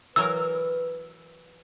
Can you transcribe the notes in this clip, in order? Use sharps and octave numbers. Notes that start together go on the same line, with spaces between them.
E3 F#3 A#4 B4 E6